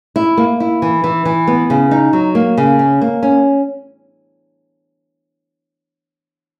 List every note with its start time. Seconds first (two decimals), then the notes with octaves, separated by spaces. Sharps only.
0.16 E4
0.37 A#3
0.60 E4
0.82 E3
1.04 E3
1.25 E3
1.47 B3
1.70 C#3
1.91 D#4
2.13 F#3
2.35 A#3
2.57 C#3
2.79 C#4
3.01 A#3
3.23 C#4